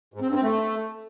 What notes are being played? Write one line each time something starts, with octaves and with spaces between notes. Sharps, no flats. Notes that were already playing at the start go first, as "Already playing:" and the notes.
G#2
C4
G2
C4
A3